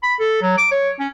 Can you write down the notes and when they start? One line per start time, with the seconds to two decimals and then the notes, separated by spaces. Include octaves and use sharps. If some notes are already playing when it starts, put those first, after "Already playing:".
0.03 B5
0.19 A4
0.42 F#3
0.57 D6
0.71 C#5
0.99 C#4